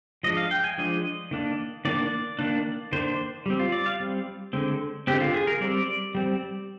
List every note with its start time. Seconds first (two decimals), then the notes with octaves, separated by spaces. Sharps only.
0.23 F3 G#3 D4 D#5
0.37 F5
0.51 G5
0.64 G#5
0.78 F3 G#3 D4 D#5
1.31 D#3 A#3 D4
1.85 D#3 A#3 D4 D5
2.39 D#3 A#3 D4
2.93 D#3 A#3 D4 C5
3.46 G3 C4
3.59 F4
3.72 D5
3.86 F5
4.00 G3 C4
4.53 D3 G#3 C4
5.07 D3 G#3 C4 G4
5.21 F4
5.34 G#4
5.47 A#4
5.61 G3 C4 D5
6.15 G3 C4